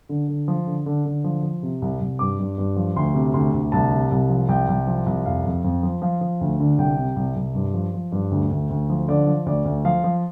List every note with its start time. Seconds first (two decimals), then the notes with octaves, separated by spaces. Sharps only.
0.09 D3
0.28 D3
0.48 F3
0.67 D3
0.86 D3
1.05 D3
1.24 F3
1.43 F3
1.63 C3
1.82 C2
2.01 C2
2.19 G2 D6
2.39 G2
2.58 G2
2.76 F3
2.96 D2 C6
3.15 C3
3.34 D2 C6
3.53 D2
3.72 C2 A5
3.92 C3
4.11 C2
4.29 F3
4.49 C2 G5
4.68 C2
4.87 F3
5.06 C2
5.26 F2 F5
5.45 F2
5.64 F2
5.83 F3
6.02 F3 F5
6.21 F3
6.41 D2
6.60 D3
6.78 C2 G5
6.98 C3
7.16 C2
7.36 C2
7.55 G2
7.74 F3
7.94 F3
8.12 G2
8.31 D2
8.51 D2
8.70 D2
8.90 F3
9.08 D3 D5
9.27 F3
9.46 D2 D5
9.65 D2
9.85 F3 F5
10.04 F3